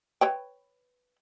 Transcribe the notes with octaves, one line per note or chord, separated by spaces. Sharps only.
B4 C#5 G5